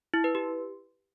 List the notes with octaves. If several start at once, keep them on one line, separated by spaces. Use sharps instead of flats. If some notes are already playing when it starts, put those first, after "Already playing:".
E4
B4
G4